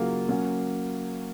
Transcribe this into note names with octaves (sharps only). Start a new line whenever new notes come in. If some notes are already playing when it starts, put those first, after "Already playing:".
Already playing: C#3 F#3 A#3 C#4 F4
F#3 A#3 C#4